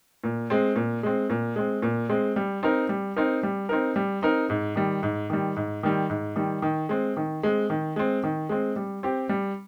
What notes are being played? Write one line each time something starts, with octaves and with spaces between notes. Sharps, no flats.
A#2
G#3 C4
A#2
G#3 C4
A#2
G#3 C4
A#2
G#3 C4
G3
C4 D#4 A#4
G3
C4 D#4 A#4
G3
C4 D#4 A#4
G3
C4 D#4 A#4
G#2
D#3 G3
G#2
D#3 G3
G#2
D#3 G3
G#2
D#3 G3
D#3
G#3 C4
D#3
G#3 C4
D#3
G#3 C4
D#3
G#3 C4
G3
C4 G4
G3